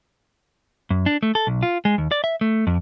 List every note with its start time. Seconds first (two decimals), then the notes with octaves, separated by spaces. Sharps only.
0.90 F#2
1.06 D4
1.23 A3
1.35 A4
1.47 B1
1.63 F4
1.85 G#3
1.98 D#2
2.11 D5
2.24 E5
2.41 A3
2.67 F2